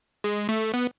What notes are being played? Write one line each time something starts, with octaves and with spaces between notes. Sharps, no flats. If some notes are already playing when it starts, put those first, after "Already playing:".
G#3
A3
B3